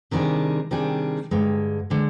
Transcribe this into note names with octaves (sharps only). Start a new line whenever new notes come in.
C3 D#3 G3 D4 G#4
C3 D#3 G3 D4 G#4
G2 D3 G#3
D3 G#3